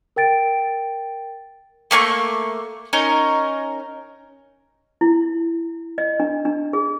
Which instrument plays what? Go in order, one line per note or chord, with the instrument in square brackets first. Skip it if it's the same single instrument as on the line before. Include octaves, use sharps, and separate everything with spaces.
[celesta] A#4 G5 A6 D7
[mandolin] A3 A#3 G#5 C#6
C#4 D#4 A#4
[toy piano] E4
D#5
D4
D4
G#4